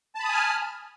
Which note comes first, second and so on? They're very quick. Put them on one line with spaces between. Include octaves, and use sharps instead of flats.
A5 B5 D#6 G#5 F6